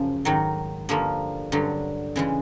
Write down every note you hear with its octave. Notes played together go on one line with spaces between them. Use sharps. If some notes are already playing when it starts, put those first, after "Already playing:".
Already playing: F#2 C#3 F3
G#2 D#3 F#3
G2 D3 F3 A#3
G2 D3 F#3
C#3 E3 G#3